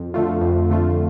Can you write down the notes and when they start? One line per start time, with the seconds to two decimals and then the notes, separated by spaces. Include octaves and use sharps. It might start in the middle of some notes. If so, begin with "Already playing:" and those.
Already playing: F2
0.14 D3 A3 F4
0.41 F2
0.70 D3 A3 F4